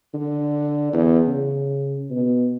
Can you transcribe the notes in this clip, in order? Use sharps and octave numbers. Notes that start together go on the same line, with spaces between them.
D3
E2
C#3
B2